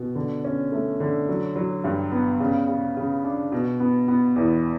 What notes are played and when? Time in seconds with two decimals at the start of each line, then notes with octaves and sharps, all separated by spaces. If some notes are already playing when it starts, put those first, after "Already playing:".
Already playing: B2
0.15 D3
0.45 C#4
0.72 A3
1.00 D3
1.29 F#3
1.56 F#3
1.84 G2
2.12 B3
2.40 C#3
2.68 C#3
2.97 C#3
3.24 D4
3.52 B2
3.80 B3
4.08 B3
4.36 E2